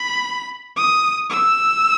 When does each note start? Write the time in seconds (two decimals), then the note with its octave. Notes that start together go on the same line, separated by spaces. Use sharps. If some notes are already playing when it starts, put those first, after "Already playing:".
Already playing: B5
0.77 D#6
1.30 E6